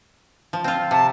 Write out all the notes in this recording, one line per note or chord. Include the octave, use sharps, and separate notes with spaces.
F3
C4 F4
C3 A5